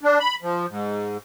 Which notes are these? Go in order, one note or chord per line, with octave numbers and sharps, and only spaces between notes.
D4
B5
F3
G#2